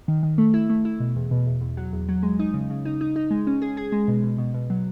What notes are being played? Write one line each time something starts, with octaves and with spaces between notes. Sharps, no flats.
D#3
D#3
A3
E4
A3
E4
B2
E2
B2
E2
E2
F#3
E2
F#3
G#3
D#4
C#3
C#3
D#4
D#4
D#4
G#3
C#4
G#4
G#4
G#3
B2
B2
B2
B2
F#3